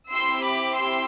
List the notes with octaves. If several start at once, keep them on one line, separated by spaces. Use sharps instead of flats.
C4 E4 G4 C6 E6
B5 D6
C6 E6